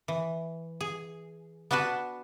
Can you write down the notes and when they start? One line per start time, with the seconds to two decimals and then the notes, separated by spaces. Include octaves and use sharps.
0.08 E3
0.81 G#4
1.71 B3 D4 F#4 B4 A5